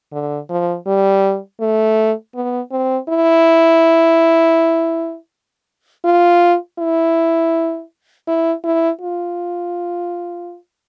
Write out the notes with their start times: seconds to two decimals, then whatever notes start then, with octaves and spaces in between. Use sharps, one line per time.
0.13 D3
0.50 F3
0.87 G3
1.61 A3
2.35 B3
2.72 C4
3.09 E4
6.05 F4
6.79 E4
8.27 E4
8.64 E4
9.01 F4